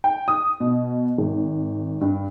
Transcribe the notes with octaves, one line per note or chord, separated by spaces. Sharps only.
G5
D#6
B2
G#1
G2